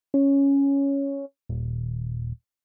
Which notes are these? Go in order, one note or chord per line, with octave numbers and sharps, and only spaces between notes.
C#4
D#1